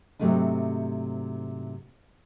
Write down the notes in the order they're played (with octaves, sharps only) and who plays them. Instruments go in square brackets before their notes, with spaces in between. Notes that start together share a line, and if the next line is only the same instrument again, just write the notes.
[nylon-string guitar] G#2 C3 F#3 A3 D4 D#4